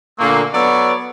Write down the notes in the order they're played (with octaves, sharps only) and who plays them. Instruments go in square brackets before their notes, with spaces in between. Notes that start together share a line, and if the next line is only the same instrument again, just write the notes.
[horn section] A#2 D3 A3 A#3
F#3 B3 A4 C#5 D5